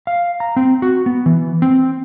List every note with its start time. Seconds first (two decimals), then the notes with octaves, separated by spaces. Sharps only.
0.07 F5
0.40 A#5
0.56 C4
0.82 F#4
1.06 B3
1.26 E3
1.62 C4